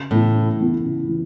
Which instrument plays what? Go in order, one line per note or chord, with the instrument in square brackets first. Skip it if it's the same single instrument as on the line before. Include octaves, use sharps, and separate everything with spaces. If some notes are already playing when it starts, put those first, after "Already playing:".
Already playing: [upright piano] C#3
[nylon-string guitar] A2 [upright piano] E3 B3 E4
[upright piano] C#3
E3 B3 E4
C#3
E3